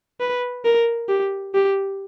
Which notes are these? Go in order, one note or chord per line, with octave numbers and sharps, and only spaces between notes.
B4
A#4
G4
G4